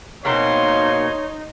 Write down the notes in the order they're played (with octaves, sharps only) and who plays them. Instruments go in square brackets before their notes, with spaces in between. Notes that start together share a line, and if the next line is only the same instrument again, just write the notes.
[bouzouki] B2 A#3 C4 [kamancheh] D#4 [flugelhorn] C#5 [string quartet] C6